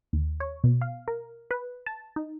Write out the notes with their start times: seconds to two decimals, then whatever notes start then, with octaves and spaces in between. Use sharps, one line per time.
0.13 D#2
0.40 C#5
0.64 B2
0.81 F5
1.08 A#4
1.51 B4
1.86 A5
2.16 D#4